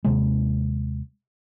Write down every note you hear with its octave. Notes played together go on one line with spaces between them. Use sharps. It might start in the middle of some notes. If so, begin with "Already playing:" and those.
D#2 C3 G#3